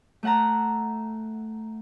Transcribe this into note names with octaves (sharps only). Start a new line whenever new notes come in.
A3 E5 F#5 A5 A#5